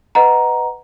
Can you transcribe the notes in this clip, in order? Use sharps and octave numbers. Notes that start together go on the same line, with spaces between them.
B4 D#5 F#5 A#5